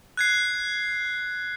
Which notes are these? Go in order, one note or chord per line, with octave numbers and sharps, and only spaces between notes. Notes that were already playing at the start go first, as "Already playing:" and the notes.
F#6 G#6 C7